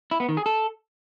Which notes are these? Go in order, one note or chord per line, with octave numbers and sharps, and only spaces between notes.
E4
B3
D#3
G#4
A4